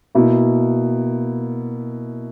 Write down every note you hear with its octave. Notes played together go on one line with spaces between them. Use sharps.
B2 A#3 E4